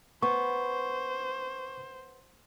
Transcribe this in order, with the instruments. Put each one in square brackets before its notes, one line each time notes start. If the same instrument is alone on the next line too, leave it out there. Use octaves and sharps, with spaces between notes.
[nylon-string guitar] B3 [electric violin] C5 [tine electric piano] C#6